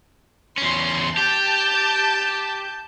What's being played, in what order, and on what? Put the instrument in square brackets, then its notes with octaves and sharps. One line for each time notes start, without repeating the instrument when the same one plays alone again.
[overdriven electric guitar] E2 C#4 [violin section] C6
[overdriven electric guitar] G4 [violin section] A5 G6